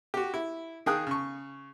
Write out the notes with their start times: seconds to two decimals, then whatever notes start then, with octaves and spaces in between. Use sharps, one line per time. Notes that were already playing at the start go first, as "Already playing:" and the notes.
0.14 F#4 G4
0.34 E4
0.86 D#3 G#4 F5 G5 D#6 F#6
1.07 C#3 C#6